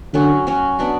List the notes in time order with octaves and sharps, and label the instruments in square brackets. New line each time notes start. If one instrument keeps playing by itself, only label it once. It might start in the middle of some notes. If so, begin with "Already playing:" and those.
[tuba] D3 [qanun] F#3 C#4 F#4
[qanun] F#3 C#4 F#4
B3 D4 F#4